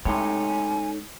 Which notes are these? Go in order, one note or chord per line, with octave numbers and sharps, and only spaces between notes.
A2 C3 G#3 C#4 D#4 A4 C#5 G#5